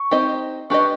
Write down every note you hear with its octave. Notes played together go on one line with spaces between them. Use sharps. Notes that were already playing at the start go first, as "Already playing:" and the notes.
Already playing: C#6
C4 D#4 G4 C5 D#5
D4 G4 B4 D#5 C#6